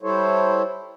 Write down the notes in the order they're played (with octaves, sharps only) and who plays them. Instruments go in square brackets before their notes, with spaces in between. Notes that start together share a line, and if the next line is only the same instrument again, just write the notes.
[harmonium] G3 E4 A4 C5 C#5